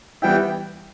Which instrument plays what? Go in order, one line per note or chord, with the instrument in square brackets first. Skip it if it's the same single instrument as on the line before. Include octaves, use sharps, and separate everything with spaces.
[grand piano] E3 G3 B3 E4 [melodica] G5